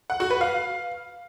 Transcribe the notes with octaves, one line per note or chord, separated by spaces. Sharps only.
F#5
F#4
B4
F5